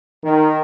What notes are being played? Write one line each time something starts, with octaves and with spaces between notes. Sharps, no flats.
D#3